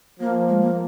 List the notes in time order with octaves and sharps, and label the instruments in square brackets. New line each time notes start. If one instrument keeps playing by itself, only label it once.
[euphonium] F3 [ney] A#3
[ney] G#3
A#3